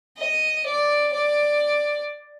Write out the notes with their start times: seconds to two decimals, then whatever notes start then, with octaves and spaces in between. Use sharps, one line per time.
0.18 D#5
0.66 D5
1.14 D5